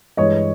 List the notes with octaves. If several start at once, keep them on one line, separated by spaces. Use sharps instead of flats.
G2 E3 G#3 C#5 D#5